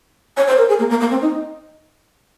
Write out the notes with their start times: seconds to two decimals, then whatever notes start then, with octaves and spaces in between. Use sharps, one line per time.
0.37 C#5
0.47 C5
0.58 A#4
0.69 G#4
0.79 A#3
0.90 A#3
1.00 A#3
1.11 C4
1.22 D#4